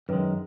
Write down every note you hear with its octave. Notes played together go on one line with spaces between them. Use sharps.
F#2 D#3 G#3 B4